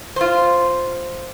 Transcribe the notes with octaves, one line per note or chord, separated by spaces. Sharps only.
F4 C5